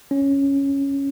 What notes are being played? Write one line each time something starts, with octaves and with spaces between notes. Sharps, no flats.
C#4